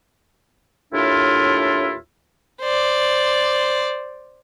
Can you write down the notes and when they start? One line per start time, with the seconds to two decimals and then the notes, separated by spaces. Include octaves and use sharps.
0.93 D#2 A2 D4 E4 F4
2.61 C5 D5